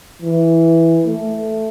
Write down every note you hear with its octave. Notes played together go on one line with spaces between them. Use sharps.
E3
A3